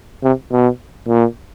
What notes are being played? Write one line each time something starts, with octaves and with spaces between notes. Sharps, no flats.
C3
B2
A#2